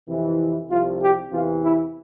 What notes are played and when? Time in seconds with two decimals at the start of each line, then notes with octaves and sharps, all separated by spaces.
0.08 F2 C3 E3
0.70 C2 C3 F3 F4
1.00 G4
1.31 E2 C3 E3 F4
1.61 E4